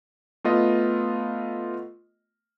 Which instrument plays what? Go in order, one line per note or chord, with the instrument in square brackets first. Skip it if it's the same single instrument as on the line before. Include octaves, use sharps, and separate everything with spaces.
[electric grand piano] A3 B3 F4 D#5